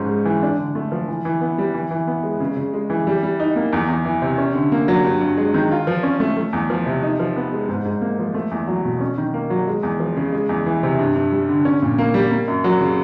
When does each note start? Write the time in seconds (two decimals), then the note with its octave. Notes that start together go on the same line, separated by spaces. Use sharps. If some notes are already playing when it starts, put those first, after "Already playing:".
Already playing: G#2 F3 C#4
0.09 G#3
0.25 E3
0.43 D4
0.59 D3
0.75 A3
0.92 F3
1.08 E3
1.25 E3
1.41 B3
1.58 G3
1.74 E3
1.91 E3
2.07 B3
2.23 G#3
2.40 C#3
2.57 C#3
2.74 G#3
2.90 E3
3.07 G3
3.23 G3
3.40 D#4
3.56 A#3
3.73 E2
3.89 E2
4.05 E3
4.22 C3
4.38 C#4
4.54 D3
4.72 A#3
4.88 F#3
5.04 G2
5.21 G2
5.38 G#3
5.54 D#3
5.71 F4
5.87 F3
6.03 C#4
6.20 A3
6.37 A3
6.53 E2
6.70 F3
6.86 C3
7.03 D#4
7.20 F3
7.36 B3
7.52 G#3
7.69 G#2
7.85 G#2
8.01 A#3
8.19 F3
8.34 A3
8.51 E2
8.68 F#3
8.85 B2
9.00 C#4
9.18 D#3
9.34 A#3
9.50 F#3
9.67 G#3
9.83 E2
10.00 F3
10.17 C#3
10.33 G#3
10.49 E2
10.66 E3
10.83 C3
10.99 G2
11.16 G2
11.32 G3
11.49 D3
11.65 C#4
11.82 A#2
11.98 A#3
12.14 G3
12.31 A#3
12.48 F#2
12.64 F#3
12.81 C#3